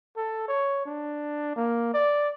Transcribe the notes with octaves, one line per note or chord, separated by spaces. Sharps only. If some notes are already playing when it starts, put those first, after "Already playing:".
A4
C#5
D4
A#3
D5